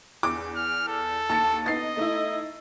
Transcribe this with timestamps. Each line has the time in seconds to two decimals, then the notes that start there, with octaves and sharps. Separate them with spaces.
0.23 E2 D6
0.56 F6
0.88 A4
1.29 D#2 A5 A6 C#7
1.66 B3 D#4 D#5 A6 C7
1.97 A3 D#4 E4